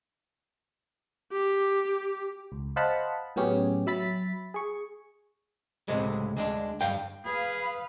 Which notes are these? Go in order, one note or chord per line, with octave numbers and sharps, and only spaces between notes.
G4
C#2
C5 D#5 F5 F#5 A5 B5
A2 F#3 B3 C#4 G4 G#4
F#3 E5 B5 A6 B6
G#4 C#6
C#2 A2 C3 G#3
D2 G#3 D4
G2 F5 G5
G#4 B4 F5 B5